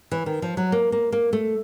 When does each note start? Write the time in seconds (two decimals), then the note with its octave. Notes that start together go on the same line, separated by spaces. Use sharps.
0.11 E3
0.26 D#3
0.42 F3
0.57 F#3
0.72 A#3
0.92 A#3
1.12 A#3
1.33 A3